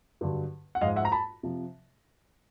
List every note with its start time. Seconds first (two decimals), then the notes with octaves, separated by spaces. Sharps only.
0.21 G2 D3 F#3
0.75 F#5
0.81 G#2 F3 G#3 D#5 F5
0.96 E5 F#5
1.05 A#5
1.12 A5 B5
1.43 C3 F3